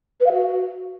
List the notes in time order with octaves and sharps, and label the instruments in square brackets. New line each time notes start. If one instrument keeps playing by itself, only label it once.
[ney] B4
F5
F#4